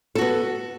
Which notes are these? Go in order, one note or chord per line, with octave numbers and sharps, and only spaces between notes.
B3 F#4 A4